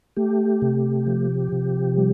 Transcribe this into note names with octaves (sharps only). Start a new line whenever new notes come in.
A3 G4
C3
F3
C3
G3